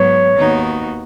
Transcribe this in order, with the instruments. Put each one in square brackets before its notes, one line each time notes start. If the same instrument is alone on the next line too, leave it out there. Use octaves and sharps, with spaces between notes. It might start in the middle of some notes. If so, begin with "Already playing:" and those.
Already playing: [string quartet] G#2 F#3 B3 [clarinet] C#5
[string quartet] D#2 D#3 B3 D#4 F#4